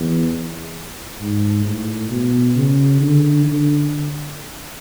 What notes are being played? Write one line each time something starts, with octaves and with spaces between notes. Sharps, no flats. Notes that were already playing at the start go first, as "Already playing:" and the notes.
Already playing: E2
G#2
A2
B2
C#3
D3
D3